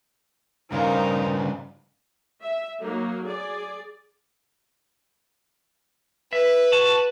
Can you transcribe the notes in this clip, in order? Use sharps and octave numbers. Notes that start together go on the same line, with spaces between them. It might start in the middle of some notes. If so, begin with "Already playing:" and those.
G2 C#3 D#4 F4 G4 A#4 C5 F5
E5
F#3 A#3 D#4
G#4 D5
B4 E5
F#4 A5